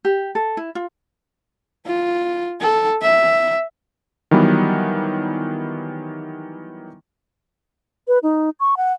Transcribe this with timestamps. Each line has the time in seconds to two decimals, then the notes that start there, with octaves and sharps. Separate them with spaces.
0.05 G4
0.35 A4
0.57 E4
0.75 F4
1.86 F4
2.61 A4
3.02 E5
4.31 D#3 E3 F#3 G3 B3
8.08 B4
8.23 D#4
8.60 C#6
8.77 F#5